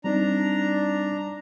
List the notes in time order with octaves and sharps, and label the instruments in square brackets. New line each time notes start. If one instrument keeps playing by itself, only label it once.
[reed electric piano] G3 C4 D#4 [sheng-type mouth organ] D4 A#5